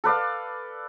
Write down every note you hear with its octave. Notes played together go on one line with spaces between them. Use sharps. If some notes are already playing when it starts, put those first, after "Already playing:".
A4 B4 D5 F5